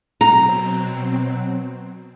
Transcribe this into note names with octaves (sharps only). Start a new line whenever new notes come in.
B2 F#3 C4 A#5